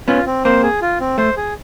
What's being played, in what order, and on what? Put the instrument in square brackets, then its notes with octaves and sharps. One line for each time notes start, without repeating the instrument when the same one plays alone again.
[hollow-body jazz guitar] B3 C#4 [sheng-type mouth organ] F4
[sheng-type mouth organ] C4
[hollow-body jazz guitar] A#3 C4 [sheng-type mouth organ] C5
[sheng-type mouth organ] G#4
F4
C4
[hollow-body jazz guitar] A3 [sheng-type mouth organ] C5
[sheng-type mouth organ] G#4